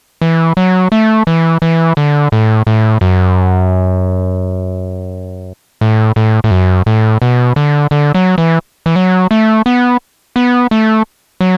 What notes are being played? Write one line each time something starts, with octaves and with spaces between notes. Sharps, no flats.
E3
F#3
A3
E3
E3
D3
A2
A2
F#2
A2
A2
A2
F#2
A2
B2
D3
D3
F#3
E3
E3
F#3
A3
B3
B3
A3
F#3